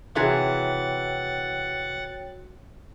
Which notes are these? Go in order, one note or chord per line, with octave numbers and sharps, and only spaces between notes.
C3 E3 F#4 G#4 C#5 F#5 G5 A6